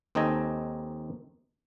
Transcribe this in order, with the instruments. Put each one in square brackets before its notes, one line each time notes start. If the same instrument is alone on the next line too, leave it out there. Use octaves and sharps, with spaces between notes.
[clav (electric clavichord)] D#2 C4 D#4 A4 D#5 G#5